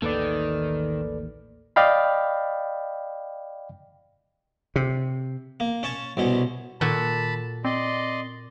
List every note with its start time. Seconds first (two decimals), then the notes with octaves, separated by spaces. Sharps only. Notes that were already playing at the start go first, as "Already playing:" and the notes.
0.02 A1 D#2 D#3 A#3 A4 B4 D5
1.76 D5 D#5 F5 G5 B5
4.76 C3
5.60 A#3
5.83 C#4 C#5 A5 C#6
6.17 C2 B2 C#4
6.81 A#2 D#3 F#4 A4 A5 B5
7.65 C4 D5 D#5 C6